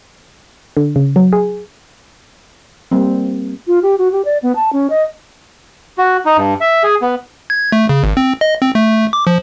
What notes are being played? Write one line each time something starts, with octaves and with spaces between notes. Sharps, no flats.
D3
C#3
F#3
G#4
G3 A#3 C4
F4
G4
F#4
G4
D5
B3
A5
C#4
D#5
F#4
D#4
G2
E5
G#4
B3
G#6
A3
C#3
G#1
C4
D#5
C4
A3
D6
F3